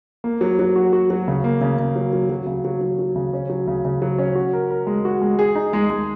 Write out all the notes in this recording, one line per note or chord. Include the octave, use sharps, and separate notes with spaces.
A#3
F#3
F#3
F#4
F#4
F#3
C#3
A#3
C#3
C#3
F#3
F#3
F#3
C#3
F#3
F#3
F#3
C#3
C#4
F#3
C#3
C#3
F#3
C#4
F#4
A#4
A#4
G#3
F#4
G#3
G#4
D#4
G#3
G#3